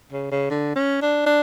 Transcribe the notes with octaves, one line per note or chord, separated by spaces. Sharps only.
C#3
C#3
D3
C#4
D4
D4